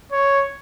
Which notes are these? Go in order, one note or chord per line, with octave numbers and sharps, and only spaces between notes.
C#5